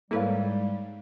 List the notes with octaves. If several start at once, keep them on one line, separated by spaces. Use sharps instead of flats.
G#2 G3 A#3 E4 A4 B4 C#5 F5